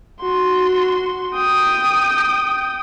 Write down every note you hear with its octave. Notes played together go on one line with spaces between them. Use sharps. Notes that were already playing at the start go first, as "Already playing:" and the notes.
F#4 C6
G5 D#6